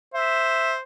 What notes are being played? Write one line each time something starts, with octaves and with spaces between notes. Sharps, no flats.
C5 E5